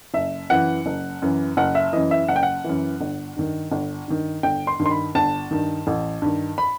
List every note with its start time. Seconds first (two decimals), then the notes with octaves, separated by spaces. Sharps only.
0.14 F#1 E5
0.50 F#2 E3 F#5
0.86 F#1
1.22 F#2 E3
1.57 F#1 F#5
1.75 E5
1.93 F#2 E3 D#5
2.11 E5
2.28 F#1 F#5
2.36 G5
2.43 F#5
2.64 F#2 E3
3.01 G1
3.36 G2 D#3
3.72 G1
4.08 G2 D#3
4.43 G1 G5
4.67 C6
4.79 G2 D#3
4.86 C6
4.91 B5
5.15 G1 A5
5.51 G2 D#3
5.87 A1
6.22 G2 D#3
6.58 B5